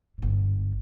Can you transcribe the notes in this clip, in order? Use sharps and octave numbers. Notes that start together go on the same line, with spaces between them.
G1 G#2